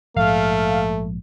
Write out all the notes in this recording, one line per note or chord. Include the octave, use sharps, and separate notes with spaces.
A#1 G#2 F3 A3 F5